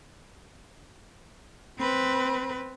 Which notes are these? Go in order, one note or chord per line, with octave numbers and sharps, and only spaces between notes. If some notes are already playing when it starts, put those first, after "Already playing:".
C4 B4